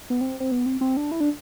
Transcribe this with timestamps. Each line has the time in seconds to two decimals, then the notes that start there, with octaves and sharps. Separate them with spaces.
0.10 B3
0.21 C4
0.40 C4
0.52 B3
0.66 C4
0.81 C4
0.97 D4
1.12 E4
1.20 D4